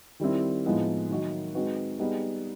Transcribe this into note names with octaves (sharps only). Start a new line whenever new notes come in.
D#3 G3 C4 E4
A2 F3 G#3 B3 D#4
D#3 F#3 A#3 D#4 F#4
G#3 C4 D#4 F#4 B4
G3 B3 D#4 G#4